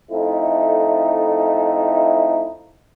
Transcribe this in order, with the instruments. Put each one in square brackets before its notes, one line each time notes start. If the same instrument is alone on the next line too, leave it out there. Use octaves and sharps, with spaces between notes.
[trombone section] F2 A3 D#4 E4